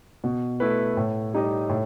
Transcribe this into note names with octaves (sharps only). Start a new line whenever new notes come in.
B2
A3 E4 B4
A2
G3 D#4 G4 D#5
A2